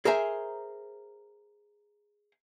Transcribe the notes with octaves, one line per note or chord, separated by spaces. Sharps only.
G#4 A#4 C5 E5 G#5 A#5